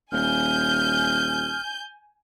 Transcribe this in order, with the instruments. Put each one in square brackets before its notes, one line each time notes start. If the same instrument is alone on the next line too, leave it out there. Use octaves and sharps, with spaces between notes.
[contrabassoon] D#1 [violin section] G#5 G6 [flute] F6